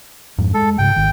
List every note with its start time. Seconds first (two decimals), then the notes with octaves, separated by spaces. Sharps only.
0.38 F2 G#2
0.54 G#3 A4
0.78 G#2 C#3 G5
0.96 G#1 D#3